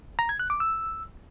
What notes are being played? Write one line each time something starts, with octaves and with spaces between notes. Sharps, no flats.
A#5
G#6
F#6
D6
E6